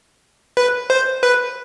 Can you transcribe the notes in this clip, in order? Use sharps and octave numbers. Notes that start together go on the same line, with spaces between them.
B4
C5
B4